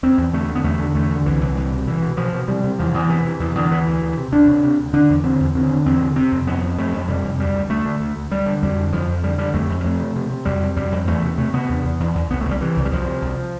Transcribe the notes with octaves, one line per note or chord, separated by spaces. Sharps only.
E2 C4
E2
D3 A3
D3
B3
E2 A3
D3
E2 A3
D3
C2 E3
C2
C2
B2
B2 E3
B2
B2 F3
B2
C3 G3
C3
E2 F3
E2
C3 E3
C3
E2 E3
E2 D3
D2 E3
D2
D2
C3
D2 D4
C3
C3
D2
D3 D4
E2
D3 C4
E2
D3 C4
D3
E2 C4
D3
C3 C4
F2
F2 B3
F2
F2 A3
F2
C3 G3
F2
D2 G3
D2
D2 A3
D3
D2
D2
D2 G3
D3
F2 G3
D3
F2 F3
F2
D3 G3
D3 G3
F2 A3
F2
G3
F2 A3
C3
C3
C3
F2 G3
C3
F2 G3
F2
E2 A3
C3
C3 A3
C3 B3
E2
E2
E2
E2
C2 B3
A3
C2
G3
C3 E3
C2
G3
C2 F3
C3
C2